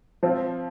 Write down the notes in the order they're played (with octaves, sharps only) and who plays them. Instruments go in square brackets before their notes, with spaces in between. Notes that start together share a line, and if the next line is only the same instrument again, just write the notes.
[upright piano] F3 C4 F4